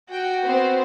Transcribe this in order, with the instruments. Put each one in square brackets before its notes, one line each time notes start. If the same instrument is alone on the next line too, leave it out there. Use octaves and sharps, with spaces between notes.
[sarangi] F#4 [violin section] G5
[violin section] B3 C4 C5